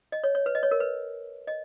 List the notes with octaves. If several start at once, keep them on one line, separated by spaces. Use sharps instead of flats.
D#5
C#5
C#5
B4
D#5
C#5
A#4
B4
D#5